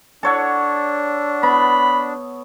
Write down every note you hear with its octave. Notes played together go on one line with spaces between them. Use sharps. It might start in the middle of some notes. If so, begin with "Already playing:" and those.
D4 A4 C#5 F#5
B3 B5